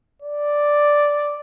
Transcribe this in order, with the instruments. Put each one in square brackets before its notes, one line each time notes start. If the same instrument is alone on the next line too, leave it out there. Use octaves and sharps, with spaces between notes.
[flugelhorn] D5